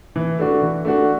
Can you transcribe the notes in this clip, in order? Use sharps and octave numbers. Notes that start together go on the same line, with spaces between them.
E3
A3 D4 F#4
E3
A3 D4 F#4